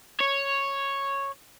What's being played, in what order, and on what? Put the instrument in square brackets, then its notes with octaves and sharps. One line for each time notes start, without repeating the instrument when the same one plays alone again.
[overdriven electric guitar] C#5